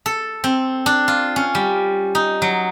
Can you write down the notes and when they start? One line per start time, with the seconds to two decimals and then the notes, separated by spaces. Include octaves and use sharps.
0.06 A4
0.44 C4
0.86 D4
1.08 F4
1.36 C#4
1.55 G3
2.15 D#4
2.42 F#3